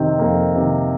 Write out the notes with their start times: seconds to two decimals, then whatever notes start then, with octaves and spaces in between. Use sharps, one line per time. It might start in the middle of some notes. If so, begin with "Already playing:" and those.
Already playing: F2 C3 D#3 C4
0.19 F2 A#3
0.56 C3 D#3